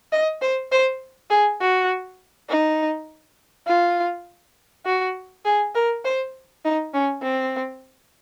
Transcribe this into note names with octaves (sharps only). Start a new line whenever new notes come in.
D#5
C5
C5
G#4
F#4
D#4
F4
F#4
G#4
A#4
C5
D#4
C#4
C4